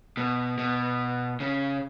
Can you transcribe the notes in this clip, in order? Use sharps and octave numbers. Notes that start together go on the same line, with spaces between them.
B2
B2
C#3